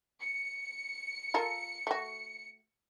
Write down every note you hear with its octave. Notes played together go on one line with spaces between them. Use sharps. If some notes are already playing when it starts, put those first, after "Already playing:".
C#7
F4 A4 A#4
A3 F#4